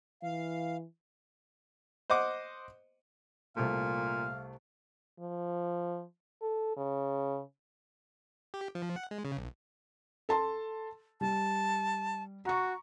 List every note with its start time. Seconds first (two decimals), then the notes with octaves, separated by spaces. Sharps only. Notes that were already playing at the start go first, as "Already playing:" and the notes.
0.23 E3 F5
2.10 C5 D#5 F#5 D6
3.57 C2 A#2 A3 F5
5.19 F3
6.42 A4
6.76 C#3
8.54 G4
8.75 F3
8.96 F#5
9.11 G#3
9.25 C#3
9.37 B1
10.29 A4 A5 C6
11.21 G3 A5
12.45 F#4 A#5 C#6